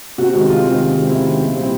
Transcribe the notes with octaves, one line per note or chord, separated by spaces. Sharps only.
C3 F#4
D#3 G#3 C4
C3 F4
D#3 G#3 C4
C3
D#3 G#3 C4
C3 E4
D#3 G#3 C4
A#2
G3 C4 E4